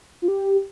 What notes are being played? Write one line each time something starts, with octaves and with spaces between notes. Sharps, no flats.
F4
G4